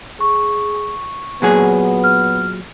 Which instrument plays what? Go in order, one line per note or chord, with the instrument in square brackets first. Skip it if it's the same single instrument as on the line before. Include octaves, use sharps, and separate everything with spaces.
[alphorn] G#4 [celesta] C#6
[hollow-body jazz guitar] A#2 F#3 G#4 [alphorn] B3
[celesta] F6